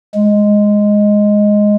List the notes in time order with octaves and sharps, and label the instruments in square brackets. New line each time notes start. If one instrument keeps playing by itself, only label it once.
[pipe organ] G#3